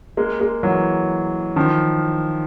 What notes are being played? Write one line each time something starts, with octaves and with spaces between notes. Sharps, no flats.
G#3 A#3
G#3 A#3
E3 F#3
D#3 F3